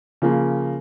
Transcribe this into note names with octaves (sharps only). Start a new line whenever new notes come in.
C#3 F3 A#3